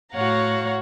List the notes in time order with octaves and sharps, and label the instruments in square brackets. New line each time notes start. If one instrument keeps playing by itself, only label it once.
[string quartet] A2 F#4 C#5 F5 F#5 A#5